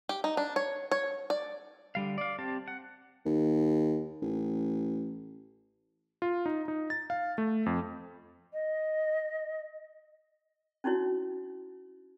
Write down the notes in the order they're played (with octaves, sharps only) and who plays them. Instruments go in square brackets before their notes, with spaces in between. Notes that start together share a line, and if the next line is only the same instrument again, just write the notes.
[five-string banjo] G4
D#4
D4
C#5
C#5
D5
[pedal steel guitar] D3 G3 F5
D5 F5
C4 G4 A5
F#5
[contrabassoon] D#2
A1
[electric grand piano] F4
D#4
D#4
A6
F5
A3
F2
[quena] D#5
[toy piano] C#4 D#4 E4 F#4 C#5